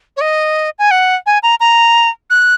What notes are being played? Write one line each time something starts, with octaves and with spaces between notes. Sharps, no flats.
C#5
D#5
G#5
F#5
G#5
A#5
A#5
F#6